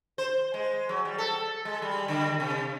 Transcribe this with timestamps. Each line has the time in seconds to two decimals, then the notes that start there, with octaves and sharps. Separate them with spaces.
0.18 C5
0.54 G#3
0.89 F#3
1.05 G3
1.18 A4
1.65 G#3
1.82 G3
2.08 D3
2.40 C3